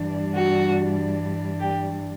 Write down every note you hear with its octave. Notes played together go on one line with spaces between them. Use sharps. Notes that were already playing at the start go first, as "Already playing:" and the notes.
Already playing: G2 E3 G3 D4
F#4
G4